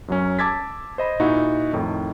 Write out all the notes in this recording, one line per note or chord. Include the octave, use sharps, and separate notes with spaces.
F#2 F#3 C#4
A5 D6 E6 G#6 A6 B6
C5 D#5 B5
A#2 D#4 E4 F#4
F2 A2 D#3